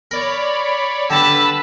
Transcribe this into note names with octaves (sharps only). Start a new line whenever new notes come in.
A#4 C#5 D5 B5
D3 G3 B4 A5 B5 E6